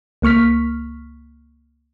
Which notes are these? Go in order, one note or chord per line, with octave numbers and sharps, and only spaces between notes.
C#2 A#3 C#6 F6 B6